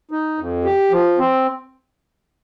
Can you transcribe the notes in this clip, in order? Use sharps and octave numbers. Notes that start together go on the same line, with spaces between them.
D#4
F2
G4
F3
C4